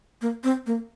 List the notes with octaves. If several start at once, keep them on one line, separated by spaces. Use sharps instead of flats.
A#3
C4
A#3